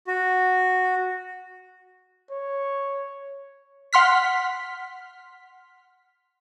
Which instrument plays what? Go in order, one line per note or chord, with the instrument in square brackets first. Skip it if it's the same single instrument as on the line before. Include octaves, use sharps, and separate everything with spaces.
[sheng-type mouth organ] F#4
[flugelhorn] C#5
[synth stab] F#5 C6 F6 B6